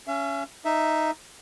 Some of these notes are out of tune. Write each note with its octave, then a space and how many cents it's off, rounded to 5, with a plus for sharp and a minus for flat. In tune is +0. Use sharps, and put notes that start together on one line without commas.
C#4 +15 E5 +45
D#4 +0 E5 +0